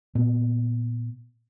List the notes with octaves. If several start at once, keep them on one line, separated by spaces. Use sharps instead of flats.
A#2 B3